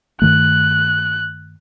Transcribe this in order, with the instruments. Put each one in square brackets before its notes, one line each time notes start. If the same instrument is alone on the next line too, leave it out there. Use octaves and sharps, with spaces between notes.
[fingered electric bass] G2 D#3 A3 [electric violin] F#6